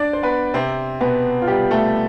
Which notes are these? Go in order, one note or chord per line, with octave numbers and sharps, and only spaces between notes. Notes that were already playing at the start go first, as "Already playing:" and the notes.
Already playing: D4 D5
C5
B3 B4
C3 C4
B2 B3
F4
G3 G4
A3 A4